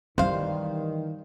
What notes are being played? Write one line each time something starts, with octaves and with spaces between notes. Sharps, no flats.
D#3 E3 G3 C5 F5